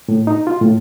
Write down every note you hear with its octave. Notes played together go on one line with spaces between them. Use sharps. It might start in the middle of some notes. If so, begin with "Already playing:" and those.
A2
D#4
F4
A2